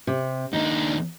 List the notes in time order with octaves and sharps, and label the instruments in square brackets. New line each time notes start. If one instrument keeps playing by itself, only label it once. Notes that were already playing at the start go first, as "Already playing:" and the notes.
[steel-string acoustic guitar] C3
[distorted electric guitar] D#2 D4 [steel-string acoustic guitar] D#4